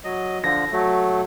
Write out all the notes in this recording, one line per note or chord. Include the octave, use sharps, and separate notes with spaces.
F#3 D#5
D3 F3 A#6
F#3 A3